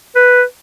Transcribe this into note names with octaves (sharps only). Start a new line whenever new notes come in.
B4